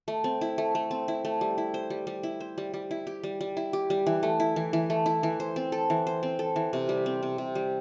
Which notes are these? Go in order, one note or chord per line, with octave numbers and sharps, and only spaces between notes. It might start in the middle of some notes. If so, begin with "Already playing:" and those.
A3
C4
E4
A3
A3
C4
E4
A3
G3
E4
C5
G3
G3
E4
C5
G3
G3
E4
G4
G3
G3
E4
G4
G3
E3
A3
E4
E3
E3
A3
E4
E3
C5
C4
A4
E3
C5
C4
A4
E3
C3
G3
C4
C3
C3
G3